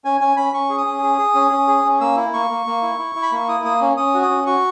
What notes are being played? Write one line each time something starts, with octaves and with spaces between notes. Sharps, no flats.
C#4 G#5
C#4 G#5
C#4 B5
C#4 C#6
G#4
D#6
C#4
G#4
G#4
C#4
C#4
G#4
C#4
A#3 E6
E4
A#3 C#6
A#3
A#3
E4
E4
E4
B5
A#3 C#6
E4 D#6
A#3 D#6
C#4
C#4 D#6
F#4
D#6
C#4
F#4 C#6